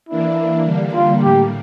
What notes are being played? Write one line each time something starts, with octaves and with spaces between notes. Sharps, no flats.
E3 A#3 D4 E4
D3 G3 A#3
F4
A2 G3 A#3 G4